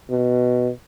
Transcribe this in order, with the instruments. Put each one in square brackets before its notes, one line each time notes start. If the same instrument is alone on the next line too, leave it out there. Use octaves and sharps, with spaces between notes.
[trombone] B2